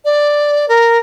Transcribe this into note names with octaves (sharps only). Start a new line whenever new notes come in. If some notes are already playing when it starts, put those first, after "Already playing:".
D5
A#4